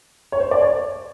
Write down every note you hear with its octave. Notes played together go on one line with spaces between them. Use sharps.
C#5
C5
D5
C#5